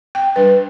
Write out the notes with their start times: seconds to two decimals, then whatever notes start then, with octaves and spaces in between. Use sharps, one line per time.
0.15 G5
0.36 G3 D4 B4